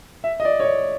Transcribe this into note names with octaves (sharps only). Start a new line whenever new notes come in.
E5
D#5
D5
C#5
D5